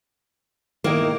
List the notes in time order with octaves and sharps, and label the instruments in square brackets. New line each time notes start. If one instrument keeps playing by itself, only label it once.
[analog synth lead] D#3 [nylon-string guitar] A#3 [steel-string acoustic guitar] D#4 E4 D#5